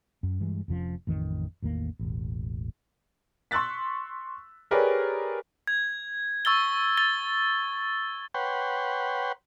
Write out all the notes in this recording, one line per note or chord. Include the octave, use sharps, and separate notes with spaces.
F#2
G2 E3 G#3
F1 F2 F3 C#4
A1 F2 D#3
A1 E2 D#3 A#3
E1 A1
C6 C#6 E6 F#6 A6 B6
G4 G#4 A#4 B4 C#5 D5
G#6
C#6 E6 A6 G7
A6 G7
B4 C#5 F#5 G5 C6